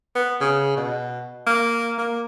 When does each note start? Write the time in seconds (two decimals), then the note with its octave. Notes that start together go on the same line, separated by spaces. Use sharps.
0.15 B3
0.41 C#3
0.77 B2
1.47 A#3
1.98 A#3